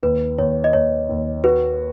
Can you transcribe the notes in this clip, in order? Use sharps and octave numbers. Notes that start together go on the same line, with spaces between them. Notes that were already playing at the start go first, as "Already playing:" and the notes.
D#2 B4
D#2 C#5
D#5
D#2 C#5
D#2
F#4 B4